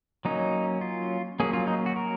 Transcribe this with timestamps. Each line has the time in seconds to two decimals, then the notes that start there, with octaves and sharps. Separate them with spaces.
0.25 F#3 A#3 C#4 D#4
0.81 F4
1.40 F#3 A#3 C#4 G#4
1.53 F4
1.67 D#4
1.86 F#4
1.96 A#4